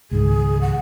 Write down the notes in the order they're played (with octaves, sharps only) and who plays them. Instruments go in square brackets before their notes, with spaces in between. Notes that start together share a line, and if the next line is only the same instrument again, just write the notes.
[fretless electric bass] C#2 G#2 D#3 [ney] G#4
[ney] F#5